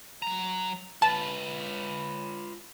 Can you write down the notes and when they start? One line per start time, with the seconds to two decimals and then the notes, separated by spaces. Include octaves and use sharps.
0.22 F#3 A#5
1.02 F4 B4 A5